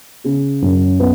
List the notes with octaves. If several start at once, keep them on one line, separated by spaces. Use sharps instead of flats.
C#3
F#2
B3